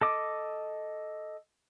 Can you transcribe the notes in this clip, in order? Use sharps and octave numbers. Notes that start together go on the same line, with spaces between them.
A4 D#5 D6